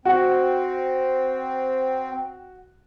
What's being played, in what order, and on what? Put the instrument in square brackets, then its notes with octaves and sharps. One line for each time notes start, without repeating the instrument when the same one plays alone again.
[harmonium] C4 [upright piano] F#4